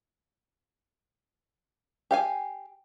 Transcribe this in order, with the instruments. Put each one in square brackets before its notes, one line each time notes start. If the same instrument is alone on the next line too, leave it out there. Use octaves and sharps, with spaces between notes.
[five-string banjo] G4 F5 G#5